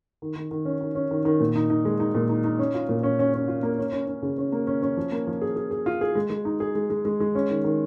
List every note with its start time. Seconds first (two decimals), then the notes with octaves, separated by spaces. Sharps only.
0.22 D#3
0.36 D#3
0.51 D#3
0.65 C#4
0.81 D#3
0.95 C#4
1.11 D#3
1.25 D#3
1.40 A#2
1.56 D#4
1.70 D#4
1.85 G#3
2.00 D#4
2.15 A#2
2.29 D#4
2.44 D#4
2.59 C#4
2.74 F4
2.89 A#2
3.03 C#4
3.19 C#4
3.34 C#4
3.48 F4
3.63 A#3
3.79 C#4
3.92 C#4
4.07 C#4
4.22 C#3
4.38 C#4
4.52 A#3
4.67 C#4
4.82 C#4
4.97 F3
5.12 A#3
5.27 F3
5.41 G#4
5.56 G#4
5.71 G#4
5.86 F4
6.01 G#4
6.15 G#3
6.30 G#3
6.45 D#4
6.60 G#4
6.75 G#3
6.90 G#3
7.05 G#3
7.20 G#3
7.35 C#4
7.50 D#3
7.64 D#3